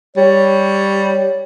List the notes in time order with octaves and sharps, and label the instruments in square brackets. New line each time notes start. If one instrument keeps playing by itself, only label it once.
[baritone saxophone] G3 [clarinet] C#5